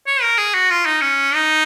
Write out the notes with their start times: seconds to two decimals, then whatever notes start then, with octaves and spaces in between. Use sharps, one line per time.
0.07 C#5
0.23 A#4
0.38 G#4
0.54 F#4
0.71 F4
0.86 D#4
1.01 C#4
1.34 D#4